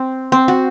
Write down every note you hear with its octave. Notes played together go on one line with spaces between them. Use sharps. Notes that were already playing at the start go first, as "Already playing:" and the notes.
Already playing: C4
C4
F#4